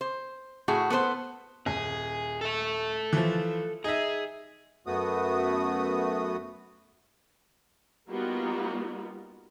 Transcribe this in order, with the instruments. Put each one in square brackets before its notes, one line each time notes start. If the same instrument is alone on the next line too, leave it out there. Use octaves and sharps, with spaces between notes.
[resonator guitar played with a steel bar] C5
A2 F#4 G#4
B3 A4 B4 C5
[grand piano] D#1 [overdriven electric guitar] G#4
[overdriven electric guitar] A4 E5
[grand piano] E3 F3
[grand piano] D#4 E5 [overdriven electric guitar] G#4
[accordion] F#2 A3 B3 F#4 D#6
[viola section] G3 A#3 B3 D#4 F4 F#4